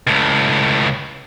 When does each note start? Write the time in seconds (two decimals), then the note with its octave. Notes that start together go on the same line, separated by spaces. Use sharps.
0.07 C#2 A2